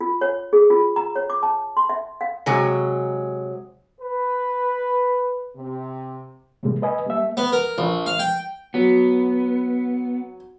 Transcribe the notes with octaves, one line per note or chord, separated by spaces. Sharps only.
F4
C#5
G#4
F4
A#5
C#5
D6
A5
C6
E5
F5
C3 F#3 G#3
B4
C3
A2 C3 E3 G3 G#3 A#3
B4 D#5 G#5
G3 A#3 E5
B3
A#4
A#1
F5
G5
F#3 B3